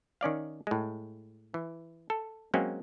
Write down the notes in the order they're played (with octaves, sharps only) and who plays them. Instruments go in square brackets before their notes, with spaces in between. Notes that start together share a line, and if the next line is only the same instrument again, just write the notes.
[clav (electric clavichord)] D#3 C#4 D5 F5
A2 G#3
E3
A4
F#3 G#3 A#3 C4 C#4